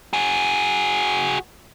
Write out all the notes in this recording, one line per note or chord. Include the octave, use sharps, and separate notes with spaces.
F#4 G#4